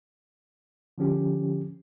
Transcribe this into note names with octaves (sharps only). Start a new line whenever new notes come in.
D3 F3 C#4 G4